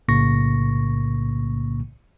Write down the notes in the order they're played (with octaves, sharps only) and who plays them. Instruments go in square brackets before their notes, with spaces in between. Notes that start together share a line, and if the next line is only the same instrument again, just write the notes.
[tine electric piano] B1 A2 C#3 A#3 C#6 A#6